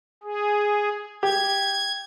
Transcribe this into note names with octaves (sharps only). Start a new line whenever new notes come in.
G#4
G4 G#6